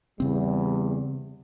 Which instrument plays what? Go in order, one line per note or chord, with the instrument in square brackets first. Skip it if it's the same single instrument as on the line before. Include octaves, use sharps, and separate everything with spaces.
[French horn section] E2 G3 [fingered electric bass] C#3 C4